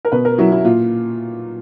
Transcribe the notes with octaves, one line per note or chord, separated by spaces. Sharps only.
A#4
B2 B4
A#4
F#3 E4
E4
A#2 F4